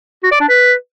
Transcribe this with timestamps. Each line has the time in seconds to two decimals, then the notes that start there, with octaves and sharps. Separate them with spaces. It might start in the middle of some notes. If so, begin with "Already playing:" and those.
0.24 F#4
0.32 D5
0.40 D4
0.49 B4